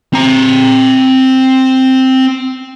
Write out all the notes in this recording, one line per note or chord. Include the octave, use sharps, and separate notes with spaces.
C4 A#5